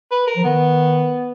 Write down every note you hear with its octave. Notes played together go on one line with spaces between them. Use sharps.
B4
A#4
F3
D#3 B3